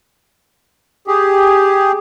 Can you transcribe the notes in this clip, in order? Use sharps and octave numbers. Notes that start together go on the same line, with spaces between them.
G4 G#4